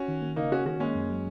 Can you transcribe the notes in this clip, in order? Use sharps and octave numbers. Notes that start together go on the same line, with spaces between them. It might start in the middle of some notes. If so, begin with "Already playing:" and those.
Already playing: C#4 F#4
D#3
A#3
C#3 A#3 D#4
A#3 C#4 F#4
D#3 C#4 F#4
G#3 A#3 C#4
F#2
F#3